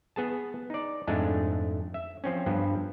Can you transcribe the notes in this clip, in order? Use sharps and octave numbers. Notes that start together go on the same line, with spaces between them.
B3 G#4 A5
D#4 D5
F2 G#2 G#3 A3 D4
E5
F3 C4 C#4
G2 F3 B3